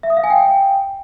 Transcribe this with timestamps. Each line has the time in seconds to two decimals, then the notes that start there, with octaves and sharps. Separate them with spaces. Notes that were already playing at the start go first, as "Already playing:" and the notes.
0.03 E5
0.10 D#6
0.17 F5
0.24 G#5
0.30 G5